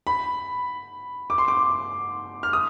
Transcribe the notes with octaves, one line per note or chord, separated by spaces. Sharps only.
B5
D6
C6
D6
F6
D#6